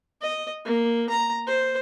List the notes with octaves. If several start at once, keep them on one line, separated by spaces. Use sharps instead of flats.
D#5
A#3
A#5
C5